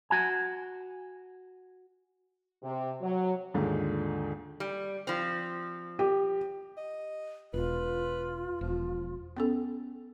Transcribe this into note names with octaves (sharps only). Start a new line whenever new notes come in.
F#4 G#5
C3
F#3
D#2 G#2 D3 F4
G3
F3 C4
G4
D#5
E1 F4 B4
E1 F3
B3 C#4 A4